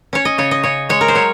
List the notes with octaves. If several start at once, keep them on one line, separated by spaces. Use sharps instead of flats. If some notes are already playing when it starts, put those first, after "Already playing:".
C#4 C#5
D#5
C#3 C#5
D#5
C#3 C#5
G#3 C#5
A#4
C5
F#3 C#5